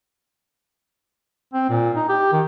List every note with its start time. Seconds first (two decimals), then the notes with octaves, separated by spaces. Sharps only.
1.54 C4
1.70 A#2
1.96 D#4
2.09 G4
2.32 D#3